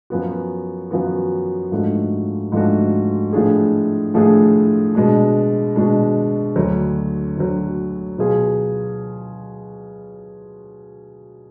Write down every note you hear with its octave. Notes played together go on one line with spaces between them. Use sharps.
F#2 F3 B3 F#4
F#2 F3 B3 F#4
G#2 F3 A3 D4 F#4
G#2 F3 A3 D4 F#4
A2 F3 A3 D4 G#4
A2 F3 A3 D4 G#4
B2 G#3 D4
B2 G#3 D4
D2 D3 F#3
D2 D3 F#3
B2 F#3 B3 F4 G#4